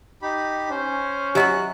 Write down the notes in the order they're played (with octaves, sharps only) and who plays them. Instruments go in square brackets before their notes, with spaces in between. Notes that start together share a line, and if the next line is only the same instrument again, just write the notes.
[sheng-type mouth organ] D#4 G4 B5
[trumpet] C#4 [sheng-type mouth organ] C5
[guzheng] F#3 E4 F#4 [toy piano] G4 D#5 [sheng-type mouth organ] F#6